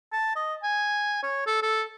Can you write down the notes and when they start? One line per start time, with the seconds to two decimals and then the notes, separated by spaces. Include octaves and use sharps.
0.12 A5
0.36 D#5
0.63 G#5
1.23 C#5
1.47 A4
1.62 A4